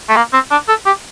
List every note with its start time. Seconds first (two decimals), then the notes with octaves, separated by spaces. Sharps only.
0.09 A3
0.17 A#3
0.34 C4
0.51 D4
0.69 A4
0.86 G4